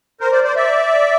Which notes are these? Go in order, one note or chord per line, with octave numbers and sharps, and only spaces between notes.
A#4 C5
C5 D5
C5 D5
D5 E5